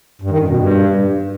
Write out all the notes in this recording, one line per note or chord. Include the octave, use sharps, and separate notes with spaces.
G2
D#3
F#2
B2
G2